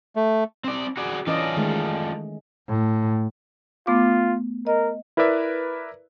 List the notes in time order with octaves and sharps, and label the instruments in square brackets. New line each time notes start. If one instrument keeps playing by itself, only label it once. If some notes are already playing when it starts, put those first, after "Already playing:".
[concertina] A3
[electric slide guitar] C4 D5
F#4 G#4 D5
[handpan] E3 C#4 D#5 [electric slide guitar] F4 A4 D5
[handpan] D#3 G#3 A3
[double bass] A2
[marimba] A3 B3 D6 [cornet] F4
[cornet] A#4 [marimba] D#5
[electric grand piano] E4 A#4 B4 D5 E5